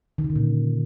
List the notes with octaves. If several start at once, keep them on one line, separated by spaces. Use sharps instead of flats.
D#3
C#3
D3
A#2